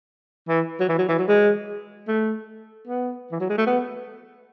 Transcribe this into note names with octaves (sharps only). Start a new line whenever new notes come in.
E3
F#3
E3
F#3
E3
F#3
G#3
A3
B3
E3
F#3
G#3
A3
B3